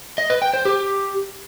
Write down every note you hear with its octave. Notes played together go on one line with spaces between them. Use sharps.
D#5
B4
G5
C5
G4